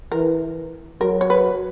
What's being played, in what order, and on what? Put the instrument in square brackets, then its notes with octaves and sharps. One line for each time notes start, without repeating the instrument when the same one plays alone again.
[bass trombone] E3 [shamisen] A#4
[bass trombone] F#3 [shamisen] A#4
[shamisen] C#5
B4